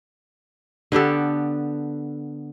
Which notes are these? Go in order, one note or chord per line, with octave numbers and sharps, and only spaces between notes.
D3 B3 G4 A4